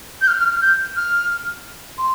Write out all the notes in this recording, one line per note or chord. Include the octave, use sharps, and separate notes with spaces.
G6
F6
F6
F6
G6
F6
C6